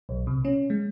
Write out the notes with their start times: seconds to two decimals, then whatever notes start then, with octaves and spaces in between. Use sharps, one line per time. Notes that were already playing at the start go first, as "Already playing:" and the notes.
0.09 B1
0.27 C3
0.45 C#4
0.70 G#3